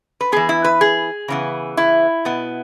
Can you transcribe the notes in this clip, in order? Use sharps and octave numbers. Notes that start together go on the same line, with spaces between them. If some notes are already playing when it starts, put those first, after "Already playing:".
B4
E3 B3 G#4
E4
B4
G#4
C#3 E3 B3
E4
B2 B3